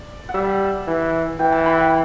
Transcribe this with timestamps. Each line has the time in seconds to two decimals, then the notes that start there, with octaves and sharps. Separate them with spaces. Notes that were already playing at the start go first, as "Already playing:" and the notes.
Already playing: D5
0.29 F#5
0.34 G3 E5
0.87 E3
1.39 E3 G5
1.53 A5
1.66 B5
1.78 G5